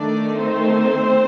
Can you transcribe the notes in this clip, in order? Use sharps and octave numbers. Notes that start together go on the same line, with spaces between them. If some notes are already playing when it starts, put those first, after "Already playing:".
Already playing: D#3 A3 D4 D#4 D5
C4 C5